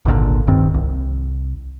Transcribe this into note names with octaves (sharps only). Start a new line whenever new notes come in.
G#1 C#2 A#2 D3
D1 G2 D#3 C4
C2